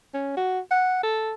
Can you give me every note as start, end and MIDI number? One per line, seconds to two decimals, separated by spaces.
0.14 0.35 61
0.37 0.59 66
0.71 0.98 78
1.03 1.34 69